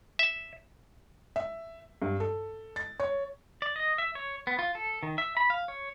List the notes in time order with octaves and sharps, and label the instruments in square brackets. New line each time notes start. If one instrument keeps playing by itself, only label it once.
[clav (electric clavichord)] E5
[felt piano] E5
G2
A4
A6
C#5
[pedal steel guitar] D5
D#5
E5
C#5
B3
F4
A4
D#3
E5
B5
F5
C#5